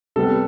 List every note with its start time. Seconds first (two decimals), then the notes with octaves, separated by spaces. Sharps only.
0.16 C3 G3 B3 A4